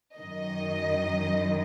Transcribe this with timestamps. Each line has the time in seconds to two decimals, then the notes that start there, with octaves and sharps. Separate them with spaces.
0.17 F#2 D#3 D#5